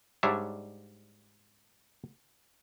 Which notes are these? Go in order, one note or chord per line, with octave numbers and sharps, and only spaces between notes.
G#2 G3 D4 C#5 E5